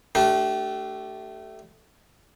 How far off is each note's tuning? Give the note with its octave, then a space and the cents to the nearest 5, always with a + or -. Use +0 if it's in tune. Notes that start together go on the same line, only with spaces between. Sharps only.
A3 +0 D4 +0 G4 -30